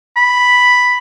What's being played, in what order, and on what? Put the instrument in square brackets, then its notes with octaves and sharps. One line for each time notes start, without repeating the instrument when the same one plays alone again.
[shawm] B5